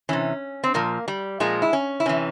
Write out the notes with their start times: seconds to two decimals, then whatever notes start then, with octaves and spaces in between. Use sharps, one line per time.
0.09 C3 E3 C#4
0.64 C4
0.74 A#2 F3 A#3
1.08 G3
1.40 A#2 F3 G#3
1.62 E4
1.73 C#4
2.00 E4
2.06 C3 E3 C#4